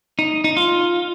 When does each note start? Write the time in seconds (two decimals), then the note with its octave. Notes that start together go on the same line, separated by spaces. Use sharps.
0.19 D#4
0.44 D#4
0.57 F4